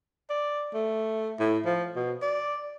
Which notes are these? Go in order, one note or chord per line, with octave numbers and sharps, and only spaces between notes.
D5
A3
A2
F3
B2
D5